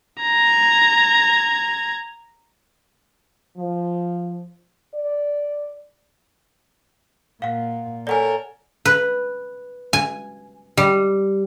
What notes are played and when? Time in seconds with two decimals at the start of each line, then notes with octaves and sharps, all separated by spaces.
0.22 A#5 G#6
3.57 F3
4.95 D5
7.42 A#2 F5 F#5
8.07 A4 A#4 C#5 D5 F#5 G#5
8.85 B4
9.93 G#5
10.77 G3